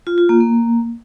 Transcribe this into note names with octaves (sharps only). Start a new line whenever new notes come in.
F4
F4
A#3
A#3